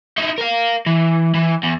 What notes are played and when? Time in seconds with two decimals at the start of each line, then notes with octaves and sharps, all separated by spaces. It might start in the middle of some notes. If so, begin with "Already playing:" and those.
0.18 D#4 E4
0.38 A#4 F5
0.86 E3
1.34 E3
1.63 E2